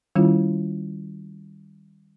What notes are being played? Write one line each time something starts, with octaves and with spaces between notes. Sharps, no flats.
D#3 G3 C#4 E4 F4